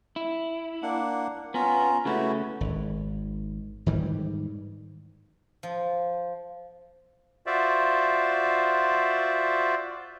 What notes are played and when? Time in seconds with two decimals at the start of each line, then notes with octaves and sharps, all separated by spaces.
0.16 E4
0.83 A#3 D4 F#5
1.54 B3 C#4 F4 A#5
2.05 C#3 A3 C#4 E4 F#4 B4
2.61 G#1
3.86 G#2 D#3 E3 G3
5.63 F3
7.46 F4 F#4 C5 D5 E5